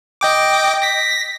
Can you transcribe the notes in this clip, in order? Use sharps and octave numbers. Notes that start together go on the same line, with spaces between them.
D#5 G5 D6
A#6 B6